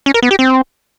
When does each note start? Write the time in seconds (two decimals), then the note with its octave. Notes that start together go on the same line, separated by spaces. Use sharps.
0.06 C#4
0.14 A#4
0.23 B3
0.31 G4
0.39 C4